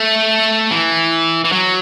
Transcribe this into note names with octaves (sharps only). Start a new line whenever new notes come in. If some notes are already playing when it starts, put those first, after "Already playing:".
Already playing: A3
E3
E3
F#3